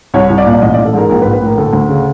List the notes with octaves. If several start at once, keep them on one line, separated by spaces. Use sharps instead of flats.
C2 C#5
C2
D5
A#2
D5
A1 D#5
A1 D5
A4
G#2 A#4
A#1 A#4
B4
A#1
B4
A2 A#4
D2 A4
D2
C#3